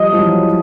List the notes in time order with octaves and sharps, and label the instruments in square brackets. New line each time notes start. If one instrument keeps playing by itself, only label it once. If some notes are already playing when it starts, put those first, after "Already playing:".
Already playing: [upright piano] F3 G3 [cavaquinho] D#5
[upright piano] F3
E3 F#3